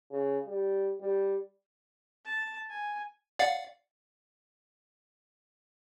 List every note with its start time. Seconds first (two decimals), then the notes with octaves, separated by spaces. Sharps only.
0.11 C#3
0.46 G3
1.00 G3
2.25 A5
2.69 G#5
3.39 D5 F5 F#5